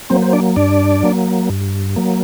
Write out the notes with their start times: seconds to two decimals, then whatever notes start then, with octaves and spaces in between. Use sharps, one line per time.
0.10 F#3 A#3 C4 C5
0.22 C5
0.33 D4 D5
0.56 G2 D4 D5
1.03 F#3 A#3
1.50 G2
1.96 F#3 A#3